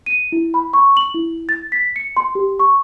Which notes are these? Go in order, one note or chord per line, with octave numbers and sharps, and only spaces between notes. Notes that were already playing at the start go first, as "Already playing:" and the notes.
D#7
E4
B5
C#6
F#7
E4
A6
B6
C#7
C6
G4
C#6